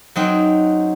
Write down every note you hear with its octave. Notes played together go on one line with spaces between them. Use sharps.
F#2 F#3 C4 D#4